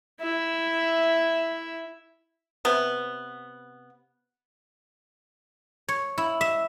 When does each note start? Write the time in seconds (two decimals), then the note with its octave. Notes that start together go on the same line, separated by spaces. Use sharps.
0.20 E4 E5
2.65 C3 B3
5.88 C#5
6.18 E4
6.41 E5